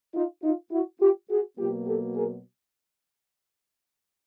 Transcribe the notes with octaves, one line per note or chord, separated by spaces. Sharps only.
D#4 F4
D#4 F4
E4 F#4
F4 G4
F#4 G#4
B2 F#3 A#3 F4 G4
G4 A4
G#4 A#4